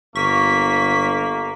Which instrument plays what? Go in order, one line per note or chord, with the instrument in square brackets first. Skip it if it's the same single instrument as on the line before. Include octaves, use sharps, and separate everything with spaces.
[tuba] G1 [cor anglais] A#3 [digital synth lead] C#6 [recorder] B6